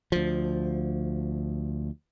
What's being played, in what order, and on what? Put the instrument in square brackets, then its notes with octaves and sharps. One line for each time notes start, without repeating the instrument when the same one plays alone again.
[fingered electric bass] D2 F3